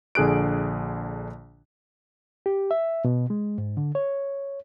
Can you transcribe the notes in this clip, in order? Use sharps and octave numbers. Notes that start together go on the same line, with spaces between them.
A#1 D3 G#4 F#6 D7
G4
E5
B2
G#3
G#2
D3
C#5